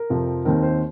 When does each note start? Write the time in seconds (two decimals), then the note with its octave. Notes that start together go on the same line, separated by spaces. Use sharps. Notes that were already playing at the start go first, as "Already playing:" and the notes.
Already playing: A#4
0.10 F2 C3 F3 C4
0.45 D#2 D#3 C4 A#4
0.63 C5